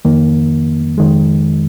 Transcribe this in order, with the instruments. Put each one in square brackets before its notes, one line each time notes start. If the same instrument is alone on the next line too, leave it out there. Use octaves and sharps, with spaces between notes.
[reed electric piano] F2 D#3 A#3
F2 D#3 G#3